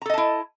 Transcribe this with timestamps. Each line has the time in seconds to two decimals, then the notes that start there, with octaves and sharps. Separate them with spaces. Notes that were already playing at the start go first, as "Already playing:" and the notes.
0.02 A#5
0.06 A4
0.10 D#5
0.14 A5
0.18 E4